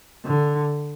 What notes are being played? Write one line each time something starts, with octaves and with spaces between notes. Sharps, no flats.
D3